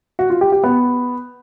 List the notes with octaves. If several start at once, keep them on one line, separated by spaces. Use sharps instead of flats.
F#4
F4
G4
G4
B3